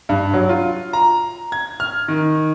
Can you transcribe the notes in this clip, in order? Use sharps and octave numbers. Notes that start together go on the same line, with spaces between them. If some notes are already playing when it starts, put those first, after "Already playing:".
G2
F#3
F4
A#5
G#6
F6
D#3